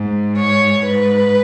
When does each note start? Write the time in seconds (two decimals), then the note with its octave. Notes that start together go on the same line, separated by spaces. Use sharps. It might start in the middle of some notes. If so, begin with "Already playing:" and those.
Already playing: G#2
0.38 C#5
0.86 G#2 B4